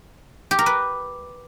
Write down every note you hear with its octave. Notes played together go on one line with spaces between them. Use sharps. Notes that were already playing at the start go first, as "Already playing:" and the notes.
G4
A#4
B4